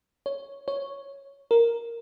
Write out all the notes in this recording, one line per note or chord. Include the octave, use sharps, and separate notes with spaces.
C#5
C#5
A#4